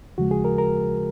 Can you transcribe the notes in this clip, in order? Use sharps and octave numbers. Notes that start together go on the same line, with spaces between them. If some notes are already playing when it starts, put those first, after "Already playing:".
D#2 C#3 F3 G#3 F#4
G#4
A#4
A#4